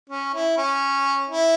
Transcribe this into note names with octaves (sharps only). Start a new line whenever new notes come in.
C#4
E4
C#4
E4